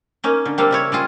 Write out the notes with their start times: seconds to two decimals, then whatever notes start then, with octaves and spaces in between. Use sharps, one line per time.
0.24 A#3 C#4 D#4
0.45 D3
0.58 G3 A#3 C4 D4 A4 F5
0.71 C#3 E4 C#5
0.92 G3 C#4 F4 G#4